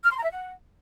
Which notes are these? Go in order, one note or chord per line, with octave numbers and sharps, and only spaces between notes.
F6
C6
A#5
E5
F#5